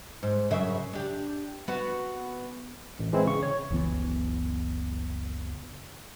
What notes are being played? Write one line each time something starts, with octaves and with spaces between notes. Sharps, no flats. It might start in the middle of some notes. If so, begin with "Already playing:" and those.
G#2
F#2 C#3 E5
D4 G4
B3 F#4
A1
E3 G#3 C4 E4
C#3 C#6
C#5
F#1 C#2 E3 B3